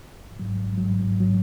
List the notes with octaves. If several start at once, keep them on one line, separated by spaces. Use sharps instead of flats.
G#1
G#2 F#3
G#1
G#2 F#3
G#1
G#2 F#3